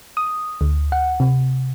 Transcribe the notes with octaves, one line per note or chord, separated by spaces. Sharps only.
D#6
D2
F#5
C3